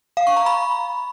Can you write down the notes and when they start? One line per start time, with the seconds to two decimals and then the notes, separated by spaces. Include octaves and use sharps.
0.17 F5
0.27 C#6
0.37 A#5
0.46 B5